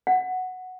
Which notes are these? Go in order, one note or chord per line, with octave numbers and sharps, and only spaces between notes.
F#5